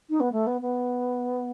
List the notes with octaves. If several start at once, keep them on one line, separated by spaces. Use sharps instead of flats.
D#4
B3
A3
B3
B3